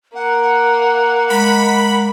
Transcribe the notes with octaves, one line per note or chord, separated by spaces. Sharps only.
A#3 F#5
G#3 B5